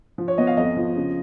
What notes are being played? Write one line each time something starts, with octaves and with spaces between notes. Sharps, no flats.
F3
C#5
B3 D#5
F5
F2 D#5
F3
C#3